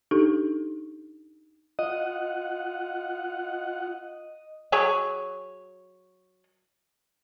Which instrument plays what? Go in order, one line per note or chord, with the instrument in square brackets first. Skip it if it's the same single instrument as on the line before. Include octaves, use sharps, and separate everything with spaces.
[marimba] D4 D#4 G4 A4
[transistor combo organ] F4 F#5 [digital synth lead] D#5
[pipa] F#3 G#4 C#5